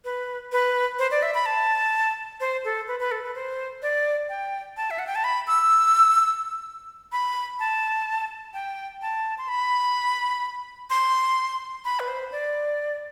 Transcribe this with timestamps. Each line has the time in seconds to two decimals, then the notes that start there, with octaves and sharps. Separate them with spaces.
0.05 B4
0.52 B4
0.99 C5
1.11 D5
1.23 E5
1.34 B5
1.46 A5
2.40 C5
2.65 A4
2.88 B4
3.00 B4
3.11 A4
3.23 B4
3.35 C5
3.82 D5
4.29 G5
4.77 A5
4.91 E5
4.99 F#5
5.07 G5
5.15 A5
5.24 B5
5.47 E6
7.12 B5
7.60 A5
8.54 G5
9.02 A5
9.38 C6
9.48 B5
10.90 C6
11.85 B5
12.00 B4
12.08 C5
12.32 D5